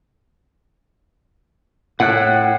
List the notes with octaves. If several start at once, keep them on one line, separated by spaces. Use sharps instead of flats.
A2 F#5 G5 F#6